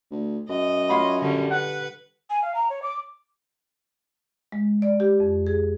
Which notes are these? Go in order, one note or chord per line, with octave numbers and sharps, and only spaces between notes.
D2
F#2 D#5
F4 C#5 F5 B5
D3 G3 C#4
B4 F#5
G#5
F5
A#5
C#5
D6
G#3
D5
G4
F2
G#4